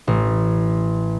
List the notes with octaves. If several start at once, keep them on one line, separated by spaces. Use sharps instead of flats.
A1